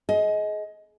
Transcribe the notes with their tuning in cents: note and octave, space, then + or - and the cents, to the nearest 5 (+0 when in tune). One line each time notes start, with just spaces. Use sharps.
G#4 +30 D#5 +20